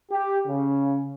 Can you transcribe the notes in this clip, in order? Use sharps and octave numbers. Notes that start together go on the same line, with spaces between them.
G4
C#3